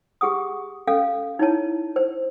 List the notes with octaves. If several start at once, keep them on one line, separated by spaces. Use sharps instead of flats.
G4 G#4 F#5 D#6
C#4 A4 F5
D#4 E4 C#5 A5
C5